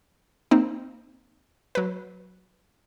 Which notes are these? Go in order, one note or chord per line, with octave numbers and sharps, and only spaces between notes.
A#3 C4 D#4
F#3 B4